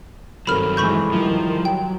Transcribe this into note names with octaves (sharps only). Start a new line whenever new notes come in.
G2 D#3 F#3 C4 A4 A#4 B5 F6
E3 G#3 B5 C#6 G6
D#3 F3 G3 E4
F#3 G5